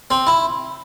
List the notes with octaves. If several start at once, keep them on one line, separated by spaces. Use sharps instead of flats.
C4
E4